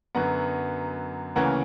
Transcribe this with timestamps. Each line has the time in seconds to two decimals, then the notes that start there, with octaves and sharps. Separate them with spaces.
0.15 F#2 D3 F#3 B3 F#5 A#5
1.36 D2 C#3 E3 A#3 C#4 F#5 A#5